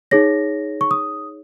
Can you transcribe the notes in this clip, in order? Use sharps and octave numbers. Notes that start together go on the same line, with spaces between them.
D#4 G#4 C#5 A#6
C#6
D#6